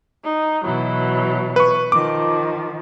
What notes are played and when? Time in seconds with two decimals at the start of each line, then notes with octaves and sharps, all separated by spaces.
0.24 D#4
0.63 B2 E3 F#3
1.56 B4 C#6
1.92 D#3 F3 D6